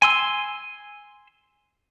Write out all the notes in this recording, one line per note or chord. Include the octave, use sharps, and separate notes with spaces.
G#5 C6 E6